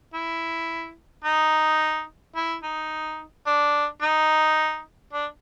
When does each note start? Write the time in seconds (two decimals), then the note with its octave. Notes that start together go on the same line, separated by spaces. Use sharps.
0.14 E4
1.25 D#4
2.36 E4
2.63 D#4
3.47 D4
4.02 D#4
5.13 D4